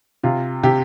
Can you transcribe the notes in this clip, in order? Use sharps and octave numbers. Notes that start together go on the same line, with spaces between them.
C3 F4
C3 G4